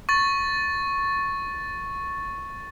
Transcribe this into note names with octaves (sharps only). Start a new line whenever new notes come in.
C#6 A6